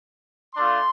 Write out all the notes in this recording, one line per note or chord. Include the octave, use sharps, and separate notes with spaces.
A3 D4 F4 C6